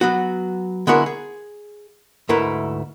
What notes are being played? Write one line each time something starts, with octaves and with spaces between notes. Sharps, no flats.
F#3 B3 F#4
D3 G#3 B3 E4 F#4 A#4
G#4
D2 G#2 A3 E4 A#4 B4